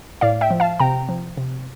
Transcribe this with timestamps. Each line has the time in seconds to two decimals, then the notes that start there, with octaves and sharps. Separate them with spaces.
0.21 A2 D5 F5
0.41 E5 G5
0.51 F3
0.60 F5 A5
0.80 C3 G5 A#5
1.09 F3
1.38 C3